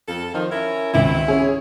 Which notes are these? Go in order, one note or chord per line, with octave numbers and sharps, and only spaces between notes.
F2 A4
D#3 F3 D#4
C#4 E4 A#4
G#1 C#2 E4
C#4 G#4